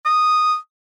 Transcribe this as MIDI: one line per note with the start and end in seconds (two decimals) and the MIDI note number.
0.06 0.56 87